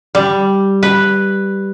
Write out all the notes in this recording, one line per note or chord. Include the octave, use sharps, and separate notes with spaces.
G3
B4